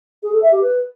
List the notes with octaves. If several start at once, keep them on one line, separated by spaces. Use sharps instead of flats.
G#4
A4
E5
G4
B4